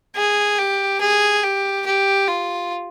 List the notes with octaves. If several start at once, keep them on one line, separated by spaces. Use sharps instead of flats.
G#4
G4
G#4
G4
G4
F4